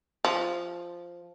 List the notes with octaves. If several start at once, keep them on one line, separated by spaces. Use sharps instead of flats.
F3